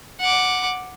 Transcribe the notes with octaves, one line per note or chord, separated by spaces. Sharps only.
F#5 D6